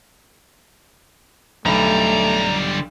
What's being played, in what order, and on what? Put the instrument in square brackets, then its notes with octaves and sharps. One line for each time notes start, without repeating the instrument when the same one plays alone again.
[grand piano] B1 B5 [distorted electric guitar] D3 G3 [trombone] A3 [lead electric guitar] A#5